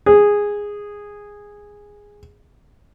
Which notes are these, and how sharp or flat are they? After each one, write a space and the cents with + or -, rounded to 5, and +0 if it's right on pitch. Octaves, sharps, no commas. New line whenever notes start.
G#4 -10